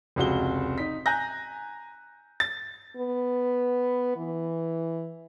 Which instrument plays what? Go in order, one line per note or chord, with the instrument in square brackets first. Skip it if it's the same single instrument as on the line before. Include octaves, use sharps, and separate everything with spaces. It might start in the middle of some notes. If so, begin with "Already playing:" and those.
[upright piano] F1 C#2 F#4 G7
D#4 B6
G#5 A#5 F#6 G6 A#6
A6
[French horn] B3
E3